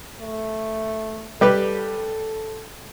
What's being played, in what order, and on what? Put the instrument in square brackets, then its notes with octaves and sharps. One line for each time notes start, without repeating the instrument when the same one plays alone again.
[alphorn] A3
[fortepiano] G3 G4 B4 [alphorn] A4